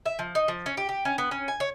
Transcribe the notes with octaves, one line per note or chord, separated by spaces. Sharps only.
E5
F3
D#4
F3
C#4
G4
G4
C#4
B3
C#4
G#5
C#5